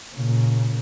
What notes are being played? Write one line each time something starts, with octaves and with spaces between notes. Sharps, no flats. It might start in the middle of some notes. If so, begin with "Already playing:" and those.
A#2 C#3